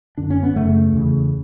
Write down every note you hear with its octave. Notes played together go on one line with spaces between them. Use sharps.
F#2 D3 D4
C#4
B3
F#2 C#3 A3
E2 C#3